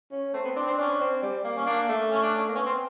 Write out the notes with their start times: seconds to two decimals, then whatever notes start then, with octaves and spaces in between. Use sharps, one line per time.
0.12 C#4
0.34 A3 C4
0.44 B3
0.56 C4 D4
0.67 C4
0.78 C#4 D4
1.00 C4
1.23 G3
1.44 A#3
1.57 C#4
1.66 A#3 D4
1.89 A3
2.11 C#4
2.22 D4
2.35 C#4
2.49 A#3
2.55 B3 C#4
2.66 C4